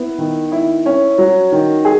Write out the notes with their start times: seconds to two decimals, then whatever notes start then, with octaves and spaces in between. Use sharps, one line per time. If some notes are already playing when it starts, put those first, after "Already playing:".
Already playing: B3 E4
0.18 D#3
0.52 E4
0.86 C#4
1.18 F#3
1.52 D#3
1.85 G#4